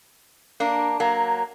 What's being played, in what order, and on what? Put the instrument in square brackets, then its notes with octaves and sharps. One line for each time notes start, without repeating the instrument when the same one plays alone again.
[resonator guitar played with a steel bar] A#3 D4
F#3 A#3